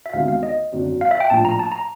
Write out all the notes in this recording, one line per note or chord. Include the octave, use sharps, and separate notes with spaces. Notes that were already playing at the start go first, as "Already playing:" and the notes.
E5
D2 C3 D#3 G#3 B3 F5
F5
D#5
G#1 F#2 D3 F#3 A#3
F5
E5
G5
A#1 A2 F3 A#3 D4 A5
A#5
A5
A#5